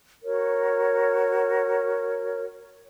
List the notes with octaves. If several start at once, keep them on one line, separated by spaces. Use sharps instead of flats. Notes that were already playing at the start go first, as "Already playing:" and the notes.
F#4 A#4 C#5